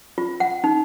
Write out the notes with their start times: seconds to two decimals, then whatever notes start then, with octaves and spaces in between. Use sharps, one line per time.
0.18 F4
0.40 F#5
0.64 D#4